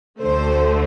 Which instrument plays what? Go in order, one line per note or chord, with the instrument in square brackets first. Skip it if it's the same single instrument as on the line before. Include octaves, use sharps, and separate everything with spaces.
[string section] D2 D3 A3 C5